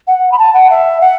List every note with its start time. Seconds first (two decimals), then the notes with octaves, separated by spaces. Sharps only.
0.08 F#5
0.32 B5
0.39 A5
0.54 F#5
0.71 E5
1.01 F#5